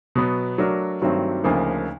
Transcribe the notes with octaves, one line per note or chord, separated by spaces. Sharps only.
B2 F#3 B3
F#3 A3 D4 F#4 A#4
G2 D#3 F#3 A3 C4
D2 C#3 F3 A#3 D#4